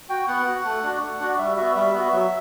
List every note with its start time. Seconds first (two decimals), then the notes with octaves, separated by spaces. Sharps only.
0.09 F#4 G5
0.28 B3 F#5
0.47 F#4
0.64 A3
0.83 D4 F#4
1.01 A3
1.20 D4 F#4
1.38 G3 E5
1.57 B3 F#4 E5
1.75 G3 E5
1.94 B3 F#4
2.12 F#3